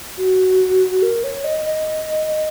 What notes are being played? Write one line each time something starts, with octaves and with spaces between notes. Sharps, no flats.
F#4
A#4
C#5
D#5
D#5